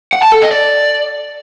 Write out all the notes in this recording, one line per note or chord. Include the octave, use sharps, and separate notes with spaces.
F#5
A5
A4
D#5
D5